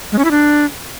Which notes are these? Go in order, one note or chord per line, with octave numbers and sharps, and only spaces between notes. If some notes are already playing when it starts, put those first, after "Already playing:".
G#3
C#4
E4
D4